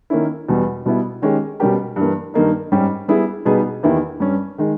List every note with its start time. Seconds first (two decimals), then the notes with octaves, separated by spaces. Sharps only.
0.10 D#3 A#3 C#4 E4
0.48 E2 B2 G3
0.86 B2 G3 B3 E4
1.22 D#3 G#3 C#4 G4
1.60 B2 G3 C#4 G4 A#4
1.96 G2 E3 A#3
2.34 G2 D#3 A#3 D#4
2.72 G#2 G3 C#4 G4
3.08 G3 B3 E4 G#4
3.45 B2 G3 B3 D#4 G#4
3.83 E2 D#3 A#3 E4 G4
4.20 G2 G3 C#4
4.58 D#3 G#3